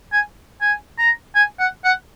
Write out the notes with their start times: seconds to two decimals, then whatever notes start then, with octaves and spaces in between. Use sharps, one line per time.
0.12 G#5
0.61 G#5
0.98 A#5
1.35 G#5
1.59 F#5
1.84 F#5